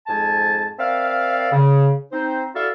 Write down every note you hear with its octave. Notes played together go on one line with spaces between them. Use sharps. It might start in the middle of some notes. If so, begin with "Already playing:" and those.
F2 G#2 G#5 A5
C4 A#4 D5 E5 F5
C#3
C4 D#4 C5
E4 F#4 A4 D5 E5 F5